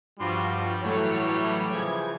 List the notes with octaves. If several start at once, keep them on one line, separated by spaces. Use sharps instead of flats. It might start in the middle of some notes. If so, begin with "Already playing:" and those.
G2 F3 G3 F4 F#4 C6
A2 E3 F#3 A3 C#5
C#3 E3 F3 G#6